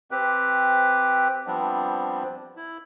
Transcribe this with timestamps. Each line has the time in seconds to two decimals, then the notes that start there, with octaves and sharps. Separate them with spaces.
0.11 C4 G4 B4
1.47 F3 G3 B3 C4 D4
2.56 E4